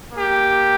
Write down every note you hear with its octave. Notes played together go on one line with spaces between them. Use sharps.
A#3 G4